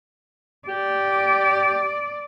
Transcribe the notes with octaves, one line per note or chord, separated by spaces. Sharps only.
G4 D5